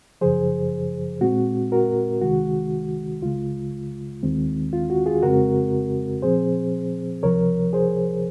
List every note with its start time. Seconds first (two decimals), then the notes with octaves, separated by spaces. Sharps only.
0.21 F#2 C#3 F3 G#4 C5
1.21 A#2 G#3 C4 F#4
1.72 F#4 A#4
2.22 C2 C3 D#3 G#3 F#4
3.22 C#2 C#3 G#3 F4
4.23 D#2 D#3 G#3 C4
4.73 F4
4.90 F#4
5.06 F4 G#4
5.23 F2 C#3 G#3 C4 F#4 A#4
6.22 A#2 F3 C4 G#4 C5
7.23 C#2 C3 F3 A#4 C#5
7.73 G#4 C5